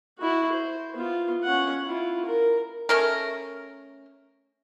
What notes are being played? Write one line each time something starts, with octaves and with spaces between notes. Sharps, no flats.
E4 F#4
C5
B3 F4
C#4 F#5
E4 F4
A#4
A3 C#4 A#4